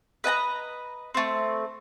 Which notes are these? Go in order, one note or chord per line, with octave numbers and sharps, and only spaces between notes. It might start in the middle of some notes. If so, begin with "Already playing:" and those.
B4 D#5 A5 A#5
A3 C4